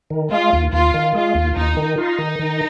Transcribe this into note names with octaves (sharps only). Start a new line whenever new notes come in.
D#3
G#3 F4
D#2
D#2 F4
D#3
G#3 F4
D#2
D#2 D#4
D#3
D#4 F4
D#3
D#3